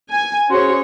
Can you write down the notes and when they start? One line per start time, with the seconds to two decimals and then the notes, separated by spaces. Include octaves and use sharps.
0.11 G#5
0.50 C#4 F#4 G#4 C5 C#5 C6